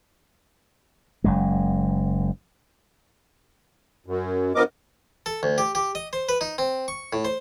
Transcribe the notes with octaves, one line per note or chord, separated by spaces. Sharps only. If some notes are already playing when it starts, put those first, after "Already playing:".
F#1 F#2 G#3
F#2
G2 F3 B3 A#4 D#5 D6
A4
D2
G4
G4
D#5
C5
B4
D#4
C4
C#6
A2
C5